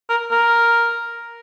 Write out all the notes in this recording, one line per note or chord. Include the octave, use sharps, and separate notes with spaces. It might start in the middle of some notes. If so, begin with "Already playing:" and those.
A#4
A#4